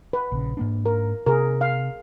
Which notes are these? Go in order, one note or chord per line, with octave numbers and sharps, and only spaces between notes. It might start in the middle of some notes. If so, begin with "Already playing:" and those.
B4
A#1 C#3
G#2 A#3 D4
A#4
C3 G#4 A#4
F5